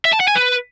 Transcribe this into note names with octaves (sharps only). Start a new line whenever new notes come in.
E5
A5
F#5
G#5
B4